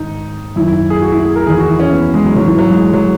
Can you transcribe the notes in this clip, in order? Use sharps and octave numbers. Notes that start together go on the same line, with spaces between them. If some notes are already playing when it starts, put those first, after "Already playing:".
Already playing: G#2 D#3 D#4
F#2 D#3 E4
E4
G#4
F#4
E4
G#4
A#4
E2 D#3 G#4
F#4
E4
C#4
B3
G#3
F#3
G#2 E3 F#3
E3
F#3
G#3
F#3